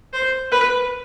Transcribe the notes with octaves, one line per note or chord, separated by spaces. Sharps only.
C5
B4